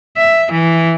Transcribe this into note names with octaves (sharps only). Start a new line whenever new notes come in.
E5
E3